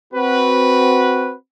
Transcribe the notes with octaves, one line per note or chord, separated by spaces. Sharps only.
C4 F#4 B4